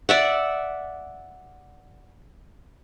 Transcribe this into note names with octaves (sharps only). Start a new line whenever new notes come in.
D5 E5 F#5